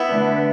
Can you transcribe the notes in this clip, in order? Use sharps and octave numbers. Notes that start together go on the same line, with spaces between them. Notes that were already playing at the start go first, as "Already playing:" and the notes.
Already playing: B3 E4
D3 A3 D4 B4 E5